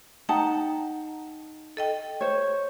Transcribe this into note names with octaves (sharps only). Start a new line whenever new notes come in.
D#4 F#5 G5 A5 A#5
A4 D#5 G5
C5 C#5